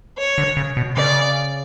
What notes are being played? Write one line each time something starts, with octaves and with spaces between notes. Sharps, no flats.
C#5
D3
C#3
B2
C#3 D5